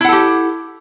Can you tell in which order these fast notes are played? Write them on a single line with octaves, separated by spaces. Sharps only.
E4 F#5 A4 G4